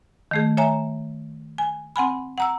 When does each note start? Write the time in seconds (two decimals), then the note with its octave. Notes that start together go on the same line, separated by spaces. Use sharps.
0.31 D#3 A3 G#4
0.57 C#5 E5 G#5 A#5
1.58 G#5
1.96 C4 F#5 G#5 B5
2.38 F#5 A#5 E6